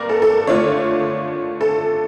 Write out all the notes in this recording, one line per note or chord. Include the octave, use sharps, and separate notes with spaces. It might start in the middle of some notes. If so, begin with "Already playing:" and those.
Already playing: G2 A#3 A#4 D5
A4
A4
D3 A3 D4 F4 C#5
A4